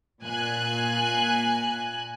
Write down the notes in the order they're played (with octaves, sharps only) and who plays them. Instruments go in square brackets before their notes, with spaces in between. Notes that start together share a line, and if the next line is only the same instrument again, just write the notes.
[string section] A#2 G#5 F#6